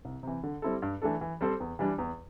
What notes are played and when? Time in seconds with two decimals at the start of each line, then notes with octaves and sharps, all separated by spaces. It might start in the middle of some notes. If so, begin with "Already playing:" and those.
0.05 C2
0.23 C3 E3
0.43 D3
0.62 G3 C4 E4 A4
0.82 G2
1.02 E3 A3 D4 A4
1.21 E3
1.41 G3 C4 A4 C5
1.60 E2
1.79 E3 G3 D4
1.98 E2